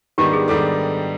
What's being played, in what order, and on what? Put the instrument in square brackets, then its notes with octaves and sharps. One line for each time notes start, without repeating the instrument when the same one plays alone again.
[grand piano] G#2 D#3 G3 B3 D4 [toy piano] G4
[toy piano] G#4
[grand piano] G#2 D#3 G3 B3 D4 [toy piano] A4